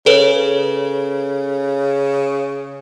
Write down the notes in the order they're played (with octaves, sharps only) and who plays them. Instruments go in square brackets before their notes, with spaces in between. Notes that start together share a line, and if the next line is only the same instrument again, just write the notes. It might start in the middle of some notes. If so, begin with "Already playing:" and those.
[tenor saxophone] C#3 [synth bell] A4 B4 C#5